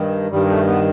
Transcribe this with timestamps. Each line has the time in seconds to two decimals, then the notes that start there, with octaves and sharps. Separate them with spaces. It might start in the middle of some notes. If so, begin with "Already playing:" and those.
Already playing: G2 D#3
0.31 G2 D#3 G3
0.49 A3
0.67 B3